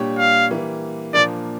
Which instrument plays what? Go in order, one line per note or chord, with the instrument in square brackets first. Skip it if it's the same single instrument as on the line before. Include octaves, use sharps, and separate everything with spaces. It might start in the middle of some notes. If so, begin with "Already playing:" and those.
Already playing: [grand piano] A#2 G3 D4 G4 C#5
[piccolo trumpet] F5
[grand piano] E3 G3 A#3
[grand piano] A#2 F3 A#3 D4 [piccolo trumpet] D5